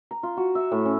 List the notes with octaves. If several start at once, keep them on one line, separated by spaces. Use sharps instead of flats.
A#5
F4
F#4
E5
A2
C#4